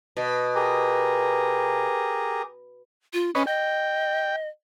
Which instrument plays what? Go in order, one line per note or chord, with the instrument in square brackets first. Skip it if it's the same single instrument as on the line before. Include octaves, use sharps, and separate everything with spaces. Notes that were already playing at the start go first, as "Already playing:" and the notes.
[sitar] B2
[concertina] G4 G#4 A#4
[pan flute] F4
[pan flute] C#4 [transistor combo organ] B4 C#5 D#5
[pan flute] D#5 [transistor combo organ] G5